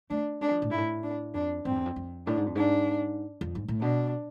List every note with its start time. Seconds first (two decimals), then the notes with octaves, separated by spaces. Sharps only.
0.10 A3 D4
0.41 G#3 D4
0.51 F3
0.62 A2
0.70 G#2 E4
0.78 A2
1.03 D4
1.34 F2 D4
1.65 G#2 C4
1.71 F2
1.75 E2
1.86 F2
1.96 F2
2.27 A2 D4
2.37 G#2
2.46 F2
2.55 G#2 D4
3.41 F2
3.55 G#2
3.68 A2
3.82 B2 D4